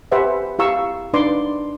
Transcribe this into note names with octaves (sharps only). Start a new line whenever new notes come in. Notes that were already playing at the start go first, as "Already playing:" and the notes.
G4 B4 C5 E5 F#5 G#5
E4 G4 F5 A#5 C#6 E6
D4 D#4 B4 D5 C6 D6